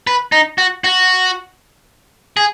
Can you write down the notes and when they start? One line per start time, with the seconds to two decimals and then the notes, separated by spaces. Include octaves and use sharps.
0.07 B4
0.32 D#4
0.58 F#4
0.84 F#4
2.37 G#4